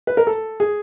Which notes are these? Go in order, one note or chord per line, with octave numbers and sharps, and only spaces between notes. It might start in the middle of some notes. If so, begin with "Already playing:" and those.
B4
A#4
A4
G#4